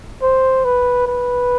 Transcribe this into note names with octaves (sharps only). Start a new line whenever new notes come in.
C5
B4
B4